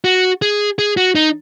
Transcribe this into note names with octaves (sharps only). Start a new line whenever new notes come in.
F#4
G#4
G#4
F#4
D#4